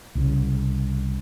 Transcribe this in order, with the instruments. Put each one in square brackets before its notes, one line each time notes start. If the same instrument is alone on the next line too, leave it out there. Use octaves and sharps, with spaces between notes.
[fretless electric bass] C2 C#3